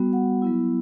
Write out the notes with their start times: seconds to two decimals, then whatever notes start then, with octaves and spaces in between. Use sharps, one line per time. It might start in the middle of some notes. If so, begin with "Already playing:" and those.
Already playing: G3 B3 F#4
0.13 F#5
0.42 F#3 B3 E4